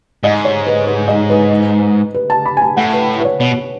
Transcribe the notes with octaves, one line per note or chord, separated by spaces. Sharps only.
G#2 D#5
C#5
B4
B4
D#5
B4
B4
A5
B5
G#5
A5
A2 F#5
B4
B4
C#5
B2 C#5